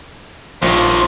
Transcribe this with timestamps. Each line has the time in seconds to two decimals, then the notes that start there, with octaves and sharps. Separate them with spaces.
0.62 A#1 D#2 A#2 F4 C5